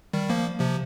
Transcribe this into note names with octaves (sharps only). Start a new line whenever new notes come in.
D#3 G3
F3 A#3
C3 F3